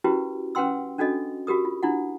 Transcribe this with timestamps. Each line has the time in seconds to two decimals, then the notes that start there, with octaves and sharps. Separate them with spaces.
0.04 C#4 E4 F#4 G4 A#4 B4
0.55 C#4 B4 F#5 G5 C6 E6
0.98 C#4 D4 F#4 A4 D#5
1.47 F#4 G4 A#4 D#6
1.65 F4
1.83 D4 E4 F4 F#5